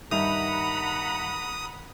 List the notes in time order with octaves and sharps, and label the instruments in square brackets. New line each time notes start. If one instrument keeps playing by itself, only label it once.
[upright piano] G2 E5 F7 [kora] D#3 [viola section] F#5 A#5 B5 [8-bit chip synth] D#6